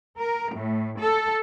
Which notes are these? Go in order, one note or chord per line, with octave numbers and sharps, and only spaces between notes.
A#4
A2
A4